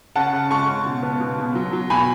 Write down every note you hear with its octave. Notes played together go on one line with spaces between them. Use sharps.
C#3 F#5 A5
C#3
G#3 A5 C#6
C#3
B2
B3
B2
B2
F#3
F#3
B2 G#5 B5